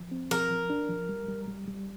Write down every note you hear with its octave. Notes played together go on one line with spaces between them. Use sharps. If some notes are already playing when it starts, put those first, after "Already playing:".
Already playing: F3
C4
F3 A#4
F3
D4
F3
G3
G3
G3
G3